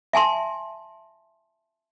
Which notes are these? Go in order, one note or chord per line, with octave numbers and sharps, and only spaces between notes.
E5 G#5 A5 C6